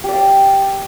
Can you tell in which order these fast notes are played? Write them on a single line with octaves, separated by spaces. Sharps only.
G4 D5 F5